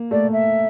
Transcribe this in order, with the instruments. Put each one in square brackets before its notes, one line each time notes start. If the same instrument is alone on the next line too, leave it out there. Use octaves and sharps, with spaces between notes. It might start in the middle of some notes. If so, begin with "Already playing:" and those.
Already playing: [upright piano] A#3
[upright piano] A3 [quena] D5
[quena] E5